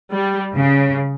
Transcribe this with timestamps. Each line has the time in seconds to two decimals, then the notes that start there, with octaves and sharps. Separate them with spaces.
0.13 G3
0.56 C#3